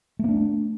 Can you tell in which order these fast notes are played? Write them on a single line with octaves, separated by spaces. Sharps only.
A3 B3 D4